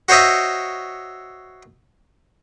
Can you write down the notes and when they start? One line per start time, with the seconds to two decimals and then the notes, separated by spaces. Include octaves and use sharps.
0.09 F#4 C5 C#5 D#5 E5